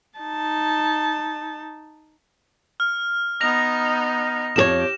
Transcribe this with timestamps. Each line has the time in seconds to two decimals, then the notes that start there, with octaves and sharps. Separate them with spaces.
0.19 D#4 A5
2.80 F6
3.40 B3 D#4 F6 A#6 F7
4.56 F2 G4 G#4 C#5 E7